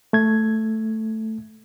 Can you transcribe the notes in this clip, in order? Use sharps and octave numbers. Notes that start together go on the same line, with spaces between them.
A3 G#6